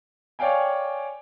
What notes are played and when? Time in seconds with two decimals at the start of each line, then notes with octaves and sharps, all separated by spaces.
0.39 C#5 D5 F5 G5 G#5